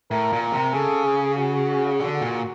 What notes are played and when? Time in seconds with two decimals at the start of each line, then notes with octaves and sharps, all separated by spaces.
0.11 A2 A#4
0.32 A#2
0.42 A#4
0.52 C3
0.74 C#3 A4
1.05 G#4
1.37 F#4
2.00 D3 F#4
2.21 A#2